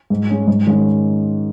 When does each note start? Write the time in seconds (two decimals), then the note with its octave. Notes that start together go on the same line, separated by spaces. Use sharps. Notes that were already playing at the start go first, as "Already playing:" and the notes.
0.10 G#2
0.29 G#3 C#4
0.47 G#2
0.66 D#3 G#3 C#4